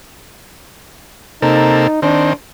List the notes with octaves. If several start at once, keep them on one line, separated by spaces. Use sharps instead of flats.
C3 A#3 D#4 A4
D#3 C4 D4